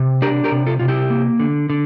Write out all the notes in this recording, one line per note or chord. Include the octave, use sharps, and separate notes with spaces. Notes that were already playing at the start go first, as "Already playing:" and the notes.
Already playing: C3
D4 G4 A#4
G4 A#4
C3
F4 A4
C3 F4
E4 G4
A#3
D3
D3